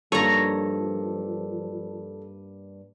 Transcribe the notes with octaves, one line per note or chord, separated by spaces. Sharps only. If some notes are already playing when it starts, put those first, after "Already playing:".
G2 F3 A#3 D#4 A4 C#5 A#5